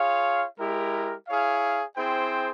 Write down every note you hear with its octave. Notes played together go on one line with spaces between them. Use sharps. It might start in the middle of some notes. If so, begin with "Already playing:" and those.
Already playing: F4 G#4 C#5 F5
G#3 E4 G4 A#4
E4 G#4 C#5 F5
C4 E4 G#4 C5 G5